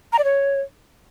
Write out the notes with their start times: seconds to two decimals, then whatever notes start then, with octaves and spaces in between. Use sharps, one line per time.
0.13 A#5
0.18 D5
0.24 C#5